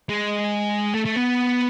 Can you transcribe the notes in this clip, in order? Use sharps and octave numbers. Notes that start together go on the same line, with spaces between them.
G#3
A3
A3
B3